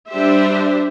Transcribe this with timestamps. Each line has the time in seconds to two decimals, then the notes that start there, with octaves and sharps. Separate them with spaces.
0.10 G3 D4 G4 C5 E5